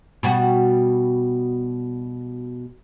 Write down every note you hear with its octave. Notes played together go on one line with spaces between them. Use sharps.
B2 G3 F#4